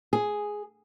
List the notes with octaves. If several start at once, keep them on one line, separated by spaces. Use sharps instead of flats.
G#4